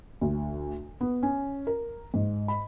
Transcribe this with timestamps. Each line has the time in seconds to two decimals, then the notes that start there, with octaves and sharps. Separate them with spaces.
0.21 D2
1.01 B3
1.23 C#4
1.67 A#4
2.14 G#2
2.48 B5